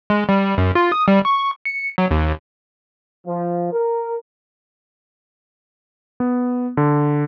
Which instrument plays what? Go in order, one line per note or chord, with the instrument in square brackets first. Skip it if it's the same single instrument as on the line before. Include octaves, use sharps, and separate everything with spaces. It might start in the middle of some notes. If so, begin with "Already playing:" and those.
[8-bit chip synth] G#3
G3
F#2
F4
D#6
G3
C#6
C#7
F#3
D#2
[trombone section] F3
A#4
[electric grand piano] B3
D3